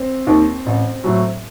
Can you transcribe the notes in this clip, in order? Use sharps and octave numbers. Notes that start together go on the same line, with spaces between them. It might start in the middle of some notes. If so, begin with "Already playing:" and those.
Already playing: C4
D#2 D#3
A1
A2 F#3